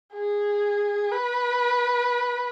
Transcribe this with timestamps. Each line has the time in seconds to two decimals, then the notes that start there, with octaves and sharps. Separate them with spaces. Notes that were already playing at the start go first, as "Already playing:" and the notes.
0.14 G#4
1.12 B4